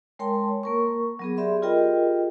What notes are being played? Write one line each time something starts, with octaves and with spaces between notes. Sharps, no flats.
G#3 A#4 C#5 G5 A5 C6
A#3 A#4 C#6
F#3 B3 G#4
G4 G#4 D5 E5 B5 C6
F4 G4 G#4 A#4 D#5 G5